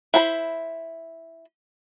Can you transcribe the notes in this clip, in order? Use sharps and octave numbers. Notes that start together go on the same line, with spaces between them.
E4 C5 A#5 B5